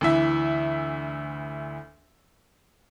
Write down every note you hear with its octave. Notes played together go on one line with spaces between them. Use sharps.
D2 E3 E5